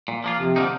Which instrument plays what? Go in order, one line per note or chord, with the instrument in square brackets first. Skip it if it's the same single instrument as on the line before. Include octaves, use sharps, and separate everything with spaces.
[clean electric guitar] A#2
F3 A#3 F4
[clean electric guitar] F2 [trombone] C3
[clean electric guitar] D3 F3 A#3 D#4